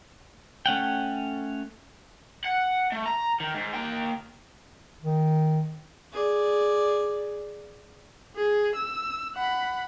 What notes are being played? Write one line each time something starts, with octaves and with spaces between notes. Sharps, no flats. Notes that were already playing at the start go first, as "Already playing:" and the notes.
A3 C#4 F#5 G5
F#5
A3
A#5
D#3
G#2
A#3 G5
D#3
G#4 D5
G#4
E6
F#5 B5